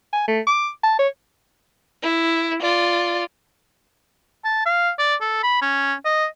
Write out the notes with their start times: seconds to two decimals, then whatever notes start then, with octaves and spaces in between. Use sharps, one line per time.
0.13 G#5
0.28 A3
0.47 D6
0.83 A5
0.99 C#5
2.02 E4
2.60 F4 D5
4.45 A5
4.66 F5
4.99 D5
5.21 A4
5.43 B5
5.62 C#4
6.05 D#5